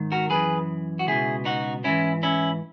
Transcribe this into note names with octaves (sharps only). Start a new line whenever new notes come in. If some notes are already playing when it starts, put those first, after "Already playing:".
Already playing: G#2 D#3
F#4 A#4
F#2 E3 G#4 B4
F#4
C#2 B2 E4 G#4
D#4 F#4
G#2 E3 C#4 E4
C#4 E4